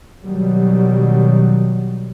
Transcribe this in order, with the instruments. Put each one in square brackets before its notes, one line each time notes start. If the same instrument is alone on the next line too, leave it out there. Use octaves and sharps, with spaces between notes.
[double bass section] B2 D#3 F#3 G3